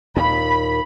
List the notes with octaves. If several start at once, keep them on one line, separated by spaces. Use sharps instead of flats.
D#2 A#2 B5